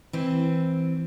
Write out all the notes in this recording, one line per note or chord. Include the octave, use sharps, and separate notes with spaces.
E3 C4